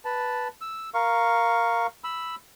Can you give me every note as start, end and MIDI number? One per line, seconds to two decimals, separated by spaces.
0.05 0.48 71
0.05 0.48 81
0.61 0.90 88
0.94 1.87 70
0.94 1.87 77
0.94 1.87 85
2.04 2.35 83
2.04 2.35 88